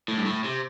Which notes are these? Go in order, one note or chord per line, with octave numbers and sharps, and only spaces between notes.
A2
G2
A2
C3